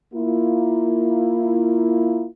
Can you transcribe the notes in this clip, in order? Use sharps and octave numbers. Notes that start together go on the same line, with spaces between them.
A#3 E4 F4